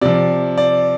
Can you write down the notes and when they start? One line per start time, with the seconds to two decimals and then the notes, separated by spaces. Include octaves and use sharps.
0.01 C3 F3 D5
0.58 D5